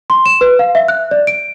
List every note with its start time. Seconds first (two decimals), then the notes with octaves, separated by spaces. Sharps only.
0.10 C6
0.26 E7
0.41 B4
0.59 F5
0.75 E5
0.88 F#6
1.11 D5
1.27 D7